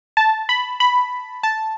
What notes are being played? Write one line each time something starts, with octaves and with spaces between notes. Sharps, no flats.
A5
B5
B5
A5